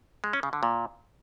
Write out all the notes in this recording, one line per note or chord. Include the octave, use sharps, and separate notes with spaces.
G#3
C#4
C#3
D3
A#2